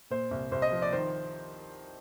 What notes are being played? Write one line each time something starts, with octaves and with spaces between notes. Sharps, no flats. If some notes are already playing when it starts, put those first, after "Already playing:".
A#2 C5
C2
C2 C5
D#5
F3
D5
D#3 C5